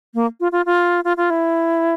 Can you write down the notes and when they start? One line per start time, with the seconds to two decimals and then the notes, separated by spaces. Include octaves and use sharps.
0.14 A#3
0.40 F4
0.52 F4
0.66 F4
1.05 F4
1.17 F4
1.30 E4